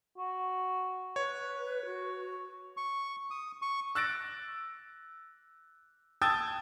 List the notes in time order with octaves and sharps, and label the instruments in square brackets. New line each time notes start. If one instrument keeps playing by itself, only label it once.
[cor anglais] F#4
[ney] B4 [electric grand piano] C#5
[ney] F#4
[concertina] C#6
D#6
C#6
[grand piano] E6 F#6 A6 A#6 D7
G5 A5 D#6 E6 G#6 A6